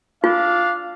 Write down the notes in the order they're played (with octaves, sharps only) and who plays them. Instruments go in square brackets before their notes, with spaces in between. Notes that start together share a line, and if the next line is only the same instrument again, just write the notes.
[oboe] D4 [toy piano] F4 [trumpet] F5